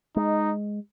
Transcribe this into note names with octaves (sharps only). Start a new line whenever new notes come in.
G#3 D#4